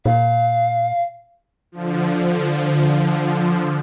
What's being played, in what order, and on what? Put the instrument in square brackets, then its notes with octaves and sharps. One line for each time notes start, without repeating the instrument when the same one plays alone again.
[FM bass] A#2 [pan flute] F5
[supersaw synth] D3 F3